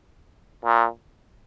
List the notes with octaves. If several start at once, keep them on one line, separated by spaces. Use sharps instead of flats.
A#2